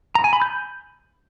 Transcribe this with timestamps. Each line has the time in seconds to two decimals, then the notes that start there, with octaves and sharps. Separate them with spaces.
0.15 A#5
0.24 G#5
0.33 B5
0.42 G6